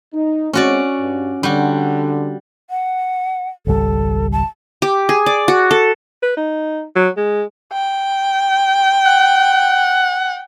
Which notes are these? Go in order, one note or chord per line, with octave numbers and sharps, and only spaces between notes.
D#4
G#3 C4 C#4 F#4 D5
G2
D3 G3 F#4
F#5
G#1 C#2 G3 A4
A5
G4
G#4
D5
F#4
A4
B4
D#4
F#3
G#3
G5
F#5